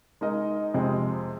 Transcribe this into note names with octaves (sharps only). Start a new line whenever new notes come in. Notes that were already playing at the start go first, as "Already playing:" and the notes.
G#3 D#4 A#4 D#5
F2 C3 F3 G#3 C4